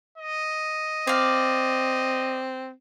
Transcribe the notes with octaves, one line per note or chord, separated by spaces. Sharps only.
D#5
C4 D5 F5